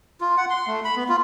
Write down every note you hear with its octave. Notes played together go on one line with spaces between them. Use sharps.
F4
F#5
C6
A3
B5
B3
F4